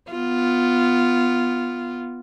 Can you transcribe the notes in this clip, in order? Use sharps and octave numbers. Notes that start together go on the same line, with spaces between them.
B3 F4